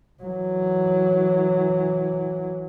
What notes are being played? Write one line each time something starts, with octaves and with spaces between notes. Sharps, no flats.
E3 F#3